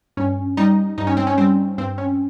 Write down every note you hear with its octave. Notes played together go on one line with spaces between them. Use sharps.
G2 C#4
G3 D#4
G2 D#4
C#4
C4
C#4
G3 C4
G2 C4
C#4